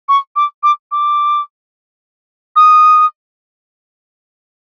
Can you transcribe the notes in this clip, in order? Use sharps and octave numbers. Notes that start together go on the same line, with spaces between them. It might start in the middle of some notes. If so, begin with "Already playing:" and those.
C#6
D6
D6
D6
D#6